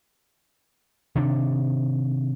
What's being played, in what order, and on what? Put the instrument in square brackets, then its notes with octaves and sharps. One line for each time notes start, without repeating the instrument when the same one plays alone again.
[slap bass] C3 D#3 D4